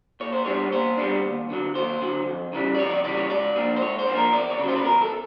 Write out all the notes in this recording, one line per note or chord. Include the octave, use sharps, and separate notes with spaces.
A#2 C#5
C5
G3 B3 D4 C#5
A#2 C5
G3 B3 D4
D#2
D3 F#3
D#2 C5
D3 F#3
F2
C#3 E3 G3
D5
F2 C#5
D5
C#3 E3 G3 D5
C#5
G#2 D5
F3 A#3 D4
C5
G#2 C#5
C5
F3 A#3 D4
A#4
E2 D5
C#5
C#3 F#3
C5
B4
E2 A#4
A4